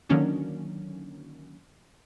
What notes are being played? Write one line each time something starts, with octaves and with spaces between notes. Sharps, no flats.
D3 D#3 F#3 A#3 C#4 D4